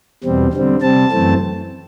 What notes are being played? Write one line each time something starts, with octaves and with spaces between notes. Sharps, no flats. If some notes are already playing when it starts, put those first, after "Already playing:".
E2 B2 G3 C4
D3 G3 C4
C3 G3 C4 A5
F#2 E3 A3 C4